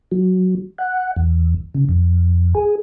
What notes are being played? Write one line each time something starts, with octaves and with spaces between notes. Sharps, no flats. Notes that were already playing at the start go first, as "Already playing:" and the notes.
F#3
F#5
E2
C#3
F2
G#4